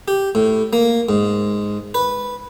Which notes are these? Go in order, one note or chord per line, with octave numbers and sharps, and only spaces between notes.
G4
A2
A#3
G#2
B4